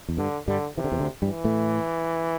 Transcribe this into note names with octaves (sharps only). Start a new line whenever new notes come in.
E2
G2 D3
G2 D3 G3
C3 E3
D3
E2 E3
D2 D3
G2 E3 G3
A2 A3